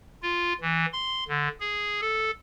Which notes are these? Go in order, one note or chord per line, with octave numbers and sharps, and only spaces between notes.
F4
E3
C6
D3
G#4
A4